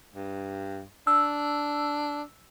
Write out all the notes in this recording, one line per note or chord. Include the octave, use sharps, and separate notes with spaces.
G2
D4 E6